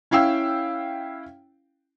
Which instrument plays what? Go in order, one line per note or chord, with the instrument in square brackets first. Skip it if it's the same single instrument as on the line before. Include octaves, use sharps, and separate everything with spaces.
[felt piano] C#4 E4 F5 G5 E6